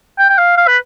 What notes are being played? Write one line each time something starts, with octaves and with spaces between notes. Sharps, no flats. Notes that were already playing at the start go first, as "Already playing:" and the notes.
G5
G5
F5
F5
B4